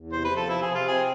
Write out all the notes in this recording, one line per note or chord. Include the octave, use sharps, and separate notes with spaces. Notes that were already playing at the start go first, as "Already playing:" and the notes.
Already playing: E2
C3 C5
B4
F3
A4
C3 E4
G#4
C3
F4
C4 G#4